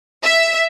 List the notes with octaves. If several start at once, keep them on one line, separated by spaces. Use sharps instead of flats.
E5